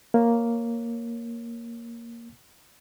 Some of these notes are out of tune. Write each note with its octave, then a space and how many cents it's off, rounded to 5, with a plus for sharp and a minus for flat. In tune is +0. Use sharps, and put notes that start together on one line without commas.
A#3 +0 C#5 +0